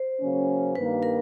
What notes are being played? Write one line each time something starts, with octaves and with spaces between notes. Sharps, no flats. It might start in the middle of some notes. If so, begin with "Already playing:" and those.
Already playing: C5
C#3 F#3 A#3 C#4
G2 D#3 G3 A#3 B4
A#4